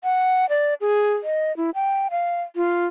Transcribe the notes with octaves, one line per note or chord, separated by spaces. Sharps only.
F#5
D5
G#4
D#5
E4
G5
F5
F4